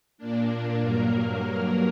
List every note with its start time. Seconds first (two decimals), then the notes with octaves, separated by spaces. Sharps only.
0.18 A#2 A#3 D4
0.80 G2 F#3 A#3 A#4
1.12 A#4